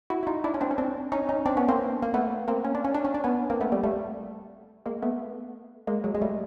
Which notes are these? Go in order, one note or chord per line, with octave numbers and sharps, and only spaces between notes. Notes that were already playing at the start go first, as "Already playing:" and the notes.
E4 F#4
E4
D#4 F4
D4 E4
C#4
C4 D4
C#4
C4 D4
C#4 D#4
C#4 D#4
C4 D4
B3 C#4
A#3 C4
A#3
A3 B3
A#3 C4
C#4
D4
C#4
D4
C#4
D4
B3 C#4
A#3 C4
A3 B3
G3 A3
G3 A3
G#3 A#3
A3 B3
G#3 A#3
F#3 G#3
G#3
G3 A3